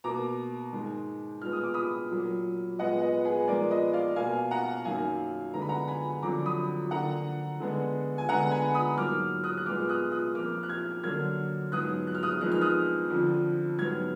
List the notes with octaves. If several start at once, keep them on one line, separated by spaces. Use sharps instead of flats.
B2 A#3 A#5 D6
G#2 D#3 G#3
A#2 G#3 B3 F6
D#6
D6
B5 D#6
A#2 F#3 A#3
A#2 G#3 B3 D#5 F#5
B4 D#5
G#4 B4
A#2 F3 G#3 B3 A#4 D5
B4 D#5
D5 F5
B2 A#3 F5 G#5
F#5 A#5
F#2 D#3 F#3 A#3 F5 G#5
D3 G#3 B3 A#5
B5
F#5 A#5
G#5 B5
F2 D3 F#3 A#5 D6
B5 D#6
D3 F3 A#3 F#5 A#5
D3 G#3 B3
G#5
D3 G#3 B3 F#5 A#5
G#5 B5
B5 D#6
G#2 F#3 A#3 D6 F6
D#6 F#6
F#6
A#2 G#3 B3 D6 F6
D#6 F#6
D#6 F#6
F2 F3 A#3 D6 F6
F#6
F6 G#6
D3 F#3 A#3 F6 G#6
G#2 F#3 B3 D#6 F#6
F#6
F6
D#6 F#6
F2 D#3 G#3 B3 F#6
F6
D#6 F#6
F2 D3 F3
G#2 F#3 B3 F6 G#6